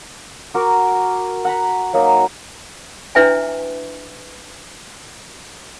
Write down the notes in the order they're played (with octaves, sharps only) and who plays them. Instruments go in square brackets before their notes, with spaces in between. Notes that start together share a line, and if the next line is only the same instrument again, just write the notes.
[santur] F#4 A#4 D6
F#5 A#5 B5
F#3 A#3 D#4
[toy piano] D4 E4 B4 E5 G5 G#5